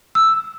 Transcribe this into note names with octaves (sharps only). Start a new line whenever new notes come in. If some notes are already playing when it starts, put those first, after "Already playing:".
E6